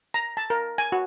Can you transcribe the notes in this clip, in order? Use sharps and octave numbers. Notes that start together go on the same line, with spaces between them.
A#5
A5
A#4
G#5
F#4